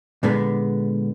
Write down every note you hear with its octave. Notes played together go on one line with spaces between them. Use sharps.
A#2 D3 G#3 B3